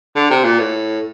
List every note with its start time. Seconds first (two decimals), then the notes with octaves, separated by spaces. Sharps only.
0.15 D3
0.30 C3
0.44 A#2
0.59 A2